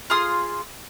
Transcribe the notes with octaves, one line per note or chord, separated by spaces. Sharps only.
F4 G#4 C6 D#6